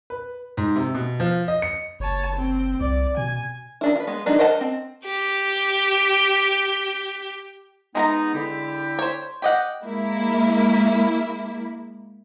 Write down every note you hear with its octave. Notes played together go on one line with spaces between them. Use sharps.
B4
G#2
C3
B2
F3
D#5
C#7
F#1 C#5 A5
C4
C2 D5
B2 G#5
D#3 D4 E4
F4 B4
G#3 B3
F#3 G#3 D4 D#4
A#4 C5 D#5 F#5 A5
C4
G4 G6
G#3 B3 D#4 A#4 A#5
D3 E4 G4
C5 C#5
G4 D#5 F#5
G#3 A#3 E4